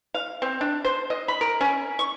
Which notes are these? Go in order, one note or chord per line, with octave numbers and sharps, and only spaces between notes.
F5
C4
D4
C5
D#5
B5
A#4
C#4
C#6